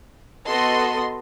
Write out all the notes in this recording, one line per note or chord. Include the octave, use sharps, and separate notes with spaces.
B3 F#4 A4 D#5 C6